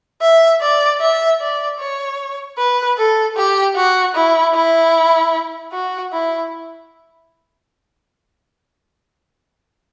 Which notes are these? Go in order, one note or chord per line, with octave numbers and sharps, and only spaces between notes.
E5
D5
E5
D5
C#5
B4
A4
G4
F#4
E4
E4
F#4
E4